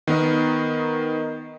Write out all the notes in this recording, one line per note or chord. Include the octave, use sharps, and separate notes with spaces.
D#3 B3 A#4 D#5